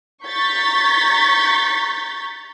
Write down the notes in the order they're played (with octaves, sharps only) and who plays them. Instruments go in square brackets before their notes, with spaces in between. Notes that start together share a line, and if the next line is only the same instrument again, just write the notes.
[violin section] A#5 C#6 G6 A6 B6